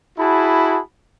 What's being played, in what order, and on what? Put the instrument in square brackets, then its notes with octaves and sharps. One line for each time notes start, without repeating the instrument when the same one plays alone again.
[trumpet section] E4 F#4 G#4 A5 B5